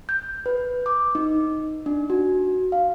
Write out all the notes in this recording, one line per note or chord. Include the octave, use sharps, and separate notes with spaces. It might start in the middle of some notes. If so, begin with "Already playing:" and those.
G6
B4
D6
D#4
D4
F#4
F5